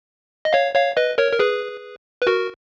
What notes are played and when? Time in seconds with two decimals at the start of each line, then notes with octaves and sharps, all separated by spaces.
0.45 D#5
0.53 C#5 F5
0.75 C#5 F5
0.97 B4 D#5
1.18 A#4 C#5
1.32 A#4
1.39 G#4 B4
2.22 B4
2.27 F#4 A#4